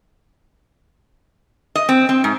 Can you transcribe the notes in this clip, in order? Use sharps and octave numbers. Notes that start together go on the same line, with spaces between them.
D#5
C4
C4
G#2